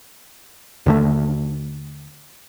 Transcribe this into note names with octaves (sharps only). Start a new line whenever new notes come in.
D#2 D3 A3